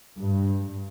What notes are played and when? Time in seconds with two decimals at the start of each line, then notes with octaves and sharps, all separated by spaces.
0.18 G2